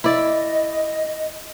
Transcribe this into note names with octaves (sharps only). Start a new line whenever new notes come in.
E4 D5 D#5